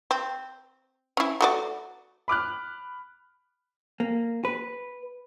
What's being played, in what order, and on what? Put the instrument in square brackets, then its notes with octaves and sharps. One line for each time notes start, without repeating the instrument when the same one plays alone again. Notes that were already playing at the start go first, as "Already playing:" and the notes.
[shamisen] C4
C#4 E4
A3 F#4 D5
[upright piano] B5 D6 F6 F#6
[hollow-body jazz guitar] A#3
B4